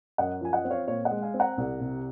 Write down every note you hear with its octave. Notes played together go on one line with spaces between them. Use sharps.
F#2 D#5 F#5
F3 G#5
D#5 F#5
C4
C#5 F5
A#2 C#5 F5
D#5 F#5
G#3
F5 G#5
C4
F#5 A#5
C2
C3